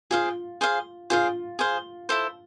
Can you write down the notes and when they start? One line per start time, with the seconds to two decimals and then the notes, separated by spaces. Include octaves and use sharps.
0.11 F4 G#4 C5 F5
0.61 G#4 C5 F5
1.10 F4 G#4 C5 F5
1.59 G#4 C5 F5
2.09 E4 A4 C5